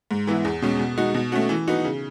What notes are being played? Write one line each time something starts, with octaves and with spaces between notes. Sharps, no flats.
G#2
E3 B3 E4
E2
B2 G#3 C#4
B2
G#3 D#4 F#4
B2
A3 C#4 F#4
E3
B3 D#4 F#4
C#3